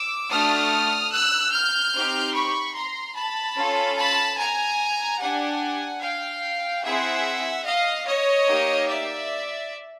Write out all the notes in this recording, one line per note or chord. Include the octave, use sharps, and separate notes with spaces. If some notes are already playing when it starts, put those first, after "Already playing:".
Already playing: D6 E6
A3 D4 F#4 A4 D#6 F6
E6 F#6
F6 G6
C4 D#4 G4
B5 C#6
A#5 C6
A5 B5
C#4 F4 A4
A5 B5
G#5 A#5
D4 G4 F#5 G#5
F5 G5
C4 E4 G#4 E5 F#5
D#5 F5
C#5 D#5
A#3 D#4 G4
D5 E5